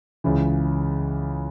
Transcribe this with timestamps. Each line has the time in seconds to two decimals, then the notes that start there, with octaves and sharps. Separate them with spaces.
0.24 C#2 C#3 E3